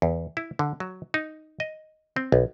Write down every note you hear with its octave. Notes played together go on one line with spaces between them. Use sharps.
E2
E4
D3
F#3
D#4
D#5
C4
B1